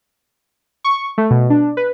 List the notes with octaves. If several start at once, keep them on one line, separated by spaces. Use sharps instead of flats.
C#6
A3
B2
D4
B4